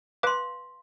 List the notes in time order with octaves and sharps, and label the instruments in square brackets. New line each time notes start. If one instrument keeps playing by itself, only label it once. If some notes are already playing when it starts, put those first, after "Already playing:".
[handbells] B4 D6 [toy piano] F5 C6